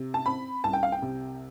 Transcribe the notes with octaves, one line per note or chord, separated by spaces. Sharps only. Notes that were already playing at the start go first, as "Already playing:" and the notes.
Already playing: C3
A5
C4 B5
C2 A5
G5
F5
G5
C3